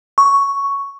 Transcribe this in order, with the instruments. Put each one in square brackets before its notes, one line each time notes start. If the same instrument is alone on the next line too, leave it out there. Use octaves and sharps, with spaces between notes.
[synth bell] C#6